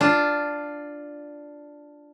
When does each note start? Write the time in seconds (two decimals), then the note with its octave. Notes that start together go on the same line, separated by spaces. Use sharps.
0.01 D4 F4